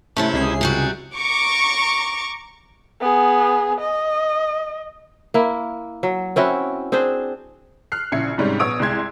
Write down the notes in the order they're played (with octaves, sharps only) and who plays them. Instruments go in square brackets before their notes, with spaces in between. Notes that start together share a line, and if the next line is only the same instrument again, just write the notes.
[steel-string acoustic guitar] C3 C#4 E4 [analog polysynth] A3
[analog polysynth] C#2 G#4 C7
[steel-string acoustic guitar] C3 G3 F#4
[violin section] A#5 C#6 D6
[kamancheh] B3 G#4
D#5
[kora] A#3 E4
F#3
C4 C#4 E4 F#4
C4 D4 G#4 C5
[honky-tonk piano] F6 F#6 C7
A#1 C#3 E4 G#6 C7 C#7
G#2 C3 G3 G#3 C#4 D#4
A#1 B3 C#5 D#6 E6 D7
C2 G#3 C6 G#6